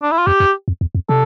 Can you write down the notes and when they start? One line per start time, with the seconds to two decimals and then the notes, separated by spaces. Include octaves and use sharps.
0.02 D4
0.11 E4
0.18 F4
0.26 F2 G4
0.40 F2
0.68 F2
0.81 E2
0.95 F2
1.09 C3 A4